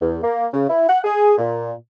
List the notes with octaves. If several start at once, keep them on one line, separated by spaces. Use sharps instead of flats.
E2
A#3
C#3
E4
F#5
G#4
A#2